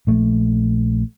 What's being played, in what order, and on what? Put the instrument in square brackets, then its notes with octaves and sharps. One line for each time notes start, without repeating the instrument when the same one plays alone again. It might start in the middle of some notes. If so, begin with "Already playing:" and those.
[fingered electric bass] A#1 A3